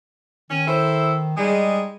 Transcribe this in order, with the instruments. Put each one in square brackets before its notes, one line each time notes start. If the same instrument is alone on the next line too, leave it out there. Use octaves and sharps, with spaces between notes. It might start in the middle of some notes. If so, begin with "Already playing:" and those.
[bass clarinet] D#3 [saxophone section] C#4
[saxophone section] E4 A4 C5
[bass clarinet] G3 [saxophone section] G#3 D#4 G#4